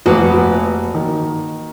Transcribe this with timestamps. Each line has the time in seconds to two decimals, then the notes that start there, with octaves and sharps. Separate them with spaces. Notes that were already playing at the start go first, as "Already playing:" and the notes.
0.06 F1 A#3 F#4 B4
0.95 D#3